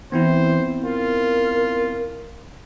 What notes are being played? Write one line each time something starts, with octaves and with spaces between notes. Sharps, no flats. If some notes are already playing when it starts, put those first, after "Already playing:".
E3 B3 C4 E4 C5
F4 A#4